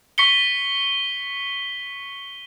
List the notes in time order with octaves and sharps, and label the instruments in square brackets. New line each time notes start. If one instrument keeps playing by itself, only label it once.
[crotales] C#6 B6 C#7 G7